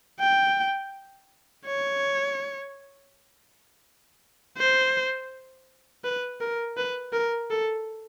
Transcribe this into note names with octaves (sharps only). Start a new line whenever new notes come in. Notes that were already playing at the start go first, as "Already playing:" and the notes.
G5
C#5
C5
B4
A#4
B4
A#4
A4